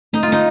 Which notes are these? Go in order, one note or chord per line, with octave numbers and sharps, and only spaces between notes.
A3 D#4
F4
A3 D#4